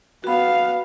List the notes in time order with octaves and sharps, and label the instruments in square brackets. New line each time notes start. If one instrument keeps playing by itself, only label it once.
[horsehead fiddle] B3 F5 [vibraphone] F#4 B5